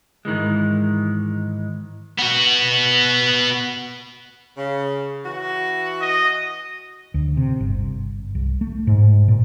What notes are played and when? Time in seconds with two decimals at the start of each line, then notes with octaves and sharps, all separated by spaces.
0.25 G#2 D#3 E3 G#3
2.19 B3 F#4
4.57 C#3
5.25 E3 F#4
6.01 D#5
7.14 D2
7.37 C3
7.60 G1
8.35 C2
8.61 A3
8.87 G#2
9.28 A#2